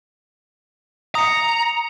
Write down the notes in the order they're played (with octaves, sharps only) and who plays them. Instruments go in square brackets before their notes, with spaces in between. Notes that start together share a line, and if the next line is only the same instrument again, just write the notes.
[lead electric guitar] A#5 [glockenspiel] D#6 C#7